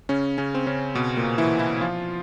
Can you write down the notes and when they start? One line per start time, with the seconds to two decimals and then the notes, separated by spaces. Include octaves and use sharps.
0.09 C#3 C#4
0.38 C#3 C#4
0.55 C4
0.67 C#3 C#4
0.95 B2 B3
1.17 A#2 A#3
1.38 E3 E4
1.59 E3 E4
1.81 F3 F4